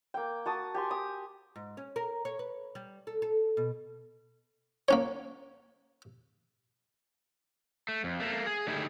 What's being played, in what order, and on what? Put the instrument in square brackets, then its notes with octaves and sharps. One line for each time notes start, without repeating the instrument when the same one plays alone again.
[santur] A#3 G5
F#4 A5 D#6
G4 G#5 C6
D#6
[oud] G#2
C#4
A#4
C#5
B4
G3
A4
A4
B2
[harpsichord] A#3 C#4 C#5
[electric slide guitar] A3
F2
A3 A#3
G#4
D3 A3 D#4 E4 G4 G#4